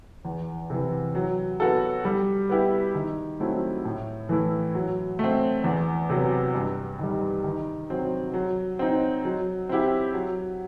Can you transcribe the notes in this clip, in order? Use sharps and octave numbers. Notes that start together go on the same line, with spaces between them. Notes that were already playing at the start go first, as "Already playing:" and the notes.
E2
C3 E3
F#3
B3 F#4 A4
G3
B3 E4 G4
D#3
F#3 A3 C4 E4
A2
E3 A3 E4
F#3
A3 C4
E2
C3 F#3 B3
G2
D#3 G3
D#3
F#3 C4
F#3
C4 D#4
F#3
C4 E4 G4
F#3